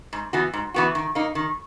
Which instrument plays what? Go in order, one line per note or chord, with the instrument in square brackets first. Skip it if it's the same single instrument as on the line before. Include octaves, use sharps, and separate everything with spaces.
[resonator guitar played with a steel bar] G#2
E3 B3 F#4
G#2
E3 B3 F#4
D#3
A#3 D#4
D#3